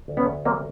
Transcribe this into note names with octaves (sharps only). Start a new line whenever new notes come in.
D2
B3 C#4
D2
F#3 A#3 C4